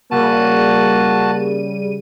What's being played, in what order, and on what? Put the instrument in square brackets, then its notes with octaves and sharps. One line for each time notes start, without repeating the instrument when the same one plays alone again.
[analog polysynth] C#3 G3 D#7 [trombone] A#3 [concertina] F#4 A5